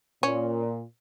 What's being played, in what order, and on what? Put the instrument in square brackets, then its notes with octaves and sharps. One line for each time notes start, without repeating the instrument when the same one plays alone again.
[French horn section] A#2 [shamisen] C#4